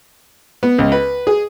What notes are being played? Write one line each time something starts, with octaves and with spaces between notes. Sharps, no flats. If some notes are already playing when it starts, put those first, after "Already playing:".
B3
C#2
B4
G#4